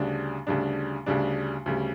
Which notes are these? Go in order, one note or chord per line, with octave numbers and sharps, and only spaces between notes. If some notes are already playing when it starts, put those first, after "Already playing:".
Already playing: D2 C#3 G3 D4
D2 C#3 G3 D4
D2 C#3 G3 D4
D2 C#3 G3